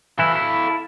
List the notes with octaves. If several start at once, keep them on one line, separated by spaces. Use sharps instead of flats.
E3 E4 A4 F5
E4